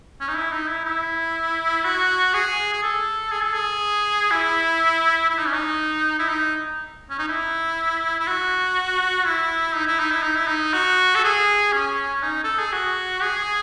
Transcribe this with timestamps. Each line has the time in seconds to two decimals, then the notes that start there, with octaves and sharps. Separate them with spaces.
0.20 C#4
0.28 D#4
0.36 E4
0.52 D#4
0.68 E4
0.84 E4
1.84 F#4
2.34 G#4
2.73 G#4
2.83 A4
3.32 G#4
3.43 A4
3.53 G#4
4.31 E4
5.30 E4
5.38 D#4
5.47 C#4
5.54 D#4
6.19 E4
6.29 D#4
7.10 C#4
7.19 D#4
7.28 E4
8.19 E4
8.27 F#4
9.26 E4
9.75 D#4
9.87 E4
9.99 D#4
10.11 E4
10.23 D#4
10.36 E4
10.47 D#4
10.74 F#4
11.15 A4
11.24 G#4
11.73 C#4
12.22 D#4
12.44 A4
12.59 G#4
12.72 F#4
13.22 G#4